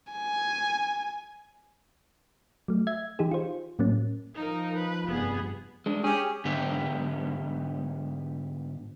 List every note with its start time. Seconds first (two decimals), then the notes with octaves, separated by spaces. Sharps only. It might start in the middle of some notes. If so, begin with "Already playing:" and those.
0.13 G#5
2.68 F#3 A3
2.87 E5 G#6
3.19 E3 D#4 G4 G#4
3.31 F4 C5
3.79 A2 F#3 A#3 C#4
4.35 F3 D#4 A#4
4.75 B4
5.07 F1 G2 B3 G#4
5.86 G#3 D4
6.04 C#4 G4 G#4
6.45 G#2 D3 B3 G4